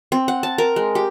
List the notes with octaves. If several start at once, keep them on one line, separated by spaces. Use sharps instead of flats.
C4
F#5
A5
A#4
G#3
G4